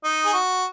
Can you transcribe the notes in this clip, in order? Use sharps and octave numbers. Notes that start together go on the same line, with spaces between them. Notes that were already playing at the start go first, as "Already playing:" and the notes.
D#4
G#4
F#4